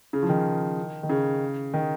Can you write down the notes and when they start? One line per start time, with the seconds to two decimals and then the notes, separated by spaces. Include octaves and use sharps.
0.13 C#3
0.23 F3
0.29 D#3
1.03 D#3
1.09 C#3
1.74 D#3